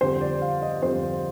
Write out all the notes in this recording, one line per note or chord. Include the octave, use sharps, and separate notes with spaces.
F2 D3 G3 C5
D5
F5
D#5
F2 D3 G3 C5